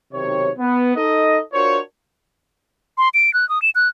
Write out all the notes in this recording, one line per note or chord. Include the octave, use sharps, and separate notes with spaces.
B1 C3 D#3 C#5
B3
D#4 A4 D#5
D4 F4 F#4 A#4 C5 C#5
C6
D7
F#6
D#6
E7
F#6